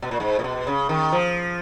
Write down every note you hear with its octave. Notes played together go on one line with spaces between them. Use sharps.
B2
A#2
G#2
A#2
B2
C#3
D#3
F3